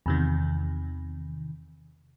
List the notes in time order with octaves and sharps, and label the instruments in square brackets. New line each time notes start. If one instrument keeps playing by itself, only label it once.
[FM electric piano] E2 C3 D#3